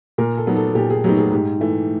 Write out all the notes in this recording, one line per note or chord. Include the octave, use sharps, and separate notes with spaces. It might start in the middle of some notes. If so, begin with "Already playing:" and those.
A#2 A#4
A4
F#3 B3 D#4
A4
A#2 G4
G#4
F#3 B3 D#4 G4
G#4
G#2 G4
E3 A3